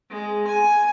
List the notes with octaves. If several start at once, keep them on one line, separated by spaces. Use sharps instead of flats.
G#3
G#5